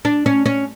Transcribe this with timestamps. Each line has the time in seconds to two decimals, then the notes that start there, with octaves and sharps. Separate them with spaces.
0.05 D4
0.26 C#4
0.46 C#4